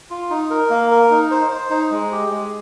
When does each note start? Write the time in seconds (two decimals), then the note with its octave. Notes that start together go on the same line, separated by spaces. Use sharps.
0.10 F4
0.30 D#4
0.50 A#4
0.70 A#3
0.91 A#4
1.11 D#4
1.31 C5
1.51 C5
1.70 D#4
1.91 G#3
2.12 G4
2.31 G#3